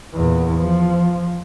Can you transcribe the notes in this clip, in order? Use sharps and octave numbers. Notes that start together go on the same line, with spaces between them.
E2 A#2
F3